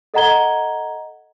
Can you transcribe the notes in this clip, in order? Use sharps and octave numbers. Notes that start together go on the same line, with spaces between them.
A4 D#5 F#5 A#5 G#6 G7